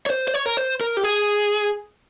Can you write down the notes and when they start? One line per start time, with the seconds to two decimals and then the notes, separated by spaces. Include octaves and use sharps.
0.06 C#5
0.10 C5
0.28 C5
0.34 C#5
0.46 A#4
0.57 C5
0.81 A#4
0.97 G4
1.04 G#4